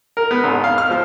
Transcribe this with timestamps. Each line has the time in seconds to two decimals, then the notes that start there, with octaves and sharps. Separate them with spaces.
0.17 A#4
0.31 B3
0.44 G#1
0.64 F5
0.78 F6
0.90 F3